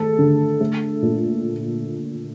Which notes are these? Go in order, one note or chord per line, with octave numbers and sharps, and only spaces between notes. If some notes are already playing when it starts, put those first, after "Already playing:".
Already playing: D#3 A3 A4
D3
A3
A#2